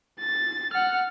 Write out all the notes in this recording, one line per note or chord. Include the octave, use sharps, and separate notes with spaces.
A6
F#5 F6